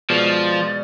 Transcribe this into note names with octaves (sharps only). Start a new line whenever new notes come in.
B2 F3 G#3 D5